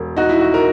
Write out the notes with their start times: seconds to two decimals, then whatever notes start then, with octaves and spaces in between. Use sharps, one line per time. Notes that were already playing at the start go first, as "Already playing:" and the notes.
Already playing: E1
0.17 D#4 F#4
0.29 E4
0.41 F#4
0.54 A#4